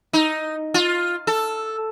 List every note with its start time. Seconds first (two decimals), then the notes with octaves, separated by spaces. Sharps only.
0.13 D#4
0.74 F4
1.27 A4